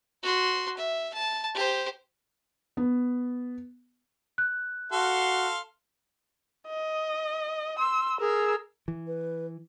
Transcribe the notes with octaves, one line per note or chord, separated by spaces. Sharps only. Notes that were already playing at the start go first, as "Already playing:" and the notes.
F#4 C6
E5
A5
G4 C5
B3
F#6
F#4 A4 F5 C6
D#5
C6 E6
G#4 A#4 E6
E3
B4